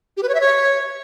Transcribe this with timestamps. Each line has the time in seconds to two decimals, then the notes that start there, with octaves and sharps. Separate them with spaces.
0.17 G4
0.23 B4
0.29 C#5
0.35 E5
0.41 C#5